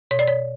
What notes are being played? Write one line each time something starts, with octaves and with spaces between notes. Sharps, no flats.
B2 C#5
D5
C#5